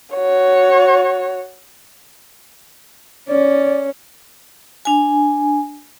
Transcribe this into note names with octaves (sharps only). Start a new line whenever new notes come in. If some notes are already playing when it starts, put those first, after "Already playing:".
F#4 C#5
C#4 D5
D4 G#5